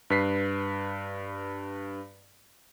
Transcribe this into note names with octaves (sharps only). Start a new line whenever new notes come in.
G2 B4 B6 C7